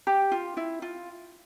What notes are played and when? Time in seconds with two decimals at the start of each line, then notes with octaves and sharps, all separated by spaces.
0.07 G4
0.32 F4
0.57 E4
0.82 F4